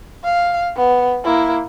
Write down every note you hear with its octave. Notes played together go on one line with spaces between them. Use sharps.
F5
B3
A#3 E4